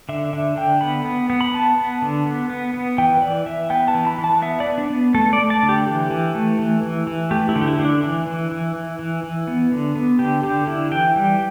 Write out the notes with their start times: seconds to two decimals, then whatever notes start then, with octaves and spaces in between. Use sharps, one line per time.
0.09 D3 E5
0.33 D3 E5
0.57 D3 G5
0.81 B3 B5
1.05 B3
1.30 B3
1.41 B5
1.54 B3 A5
1.78 B3
2.02 D3
2.26 B3
2.50 B3
2.74 B3
2.98 E3 G5
3.17 B4
3.22 E3 D5
3.46 E3 E5
3.70 B3 G5
3.88 A5
3.95 E3
4.07 B5
4.18 E3
4.24 A5
4.42 B3 E5
4.60 D5
4.66 B3
4.78 D4
4.90 B3
5.14 A3 A4
5.33 D5
5.38 A3
5.50 A5
5.63 D3
5.69 G4
5.87 E3
6.11 E3
6.35 A3
6.59 E3
6.83 E3
7.07 E3
7.31 A3 G4
7.49 E4
7.55 D3
7.61 G4
7.67 E4
7.79 D3
7.85 D4
8.03 E3
8.27 E3
8.51 E3
8.75 E3
8.99 E3
9.23 E3
9.48 B3
9.72 D3
9.96 B3
10.19 D3 G4
10.43 D3 G4
10.67 D3 E4
10.91 E3 G5
11.16 G3